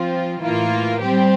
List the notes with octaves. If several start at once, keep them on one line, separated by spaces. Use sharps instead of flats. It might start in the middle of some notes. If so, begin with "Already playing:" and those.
Already playing: F3 C4 F4
A2 E3 A#3 F4
G3 C4 G4